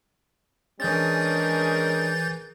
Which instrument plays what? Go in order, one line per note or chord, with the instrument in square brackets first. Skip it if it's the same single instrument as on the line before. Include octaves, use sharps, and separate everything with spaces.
[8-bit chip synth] E3 G6 A6 [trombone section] G#3 C#4 D4 [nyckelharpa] G#4 A#4